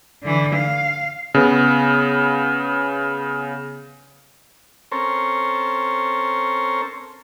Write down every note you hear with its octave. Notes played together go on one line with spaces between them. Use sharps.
D3 E3
F5
C#3 B3
C4 C#4 A4 A#4 C5 C#5